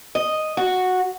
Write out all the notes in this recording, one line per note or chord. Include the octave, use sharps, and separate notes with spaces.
D#5
F#4